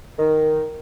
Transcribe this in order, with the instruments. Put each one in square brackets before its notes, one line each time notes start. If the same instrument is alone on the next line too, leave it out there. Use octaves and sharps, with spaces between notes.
[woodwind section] D#3